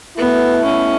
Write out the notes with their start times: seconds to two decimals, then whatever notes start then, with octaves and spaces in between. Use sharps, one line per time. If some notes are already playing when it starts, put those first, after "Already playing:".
0.17 B2 A3 B3 E4
0.64 C#4